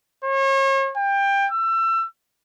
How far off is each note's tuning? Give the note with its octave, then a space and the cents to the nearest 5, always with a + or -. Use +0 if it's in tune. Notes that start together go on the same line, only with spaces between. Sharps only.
C#5 -40
G5 +20
E6 +30